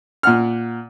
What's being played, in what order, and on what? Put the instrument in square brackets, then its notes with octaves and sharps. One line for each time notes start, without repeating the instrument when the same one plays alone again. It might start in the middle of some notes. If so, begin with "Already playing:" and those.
[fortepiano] A#2 F#5 F6